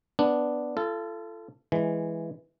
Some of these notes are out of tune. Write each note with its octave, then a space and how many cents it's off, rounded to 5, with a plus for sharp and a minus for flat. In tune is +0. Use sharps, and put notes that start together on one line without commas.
B3 +0 D4 +0
F4 -40 A4 +0
E3 +0 G#3 +0